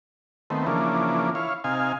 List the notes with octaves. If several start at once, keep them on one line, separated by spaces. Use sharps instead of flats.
D#3 A3 B3 C4
C#3 E3 F3 A#3 D4
E4 C#5 F5
C3 D#4 F5 G#5